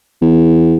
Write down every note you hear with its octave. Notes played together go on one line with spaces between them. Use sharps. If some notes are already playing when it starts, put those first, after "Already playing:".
E2